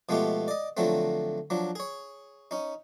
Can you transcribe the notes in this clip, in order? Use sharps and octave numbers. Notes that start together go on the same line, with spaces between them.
B2 F3 G#3 A3 B3 G4
D5 D#5
D3 F3 F#3 A3 C4
F3 F#3 D4
G#4 C#5
C#4 D#4